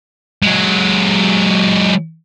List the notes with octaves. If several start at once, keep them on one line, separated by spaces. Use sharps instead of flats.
F#3 G#3